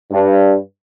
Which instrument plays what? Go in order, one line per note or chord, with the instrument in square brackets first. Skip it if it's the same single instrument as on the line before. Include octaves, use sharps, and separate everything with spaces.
[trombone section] G2